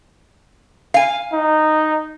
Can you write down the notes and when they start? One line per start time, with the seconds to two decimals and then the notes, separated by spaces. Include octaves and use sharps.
0.94 F5 G#5
1.33 D#4